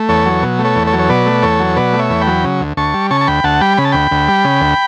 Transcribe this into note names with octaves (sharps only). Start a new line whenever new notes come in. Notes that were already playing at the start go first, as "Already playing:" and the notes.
Already playing: A3
E2 A4 C#5
F#3
B2
A3
A4 C#5
E2
A4 C#5
F#3
C#5
B2 B4 D5
A3
E2 A4 C#5
F#3
B2 B4 D5
A3
C#5 E5
E2
G5 B5
F#3
C#3
D2
D2 A5 C#6
G3
C#3 A5 C#6
A5
D2 G5 B5
D2 F#5 A5
G3 G5 B5
C#3 B5
A5
D2 G5 B5
D2
G3
C#3
D2